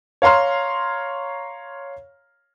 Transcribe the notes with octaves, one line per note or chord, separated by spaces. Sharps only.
C#5 F5 A#5 C6 F6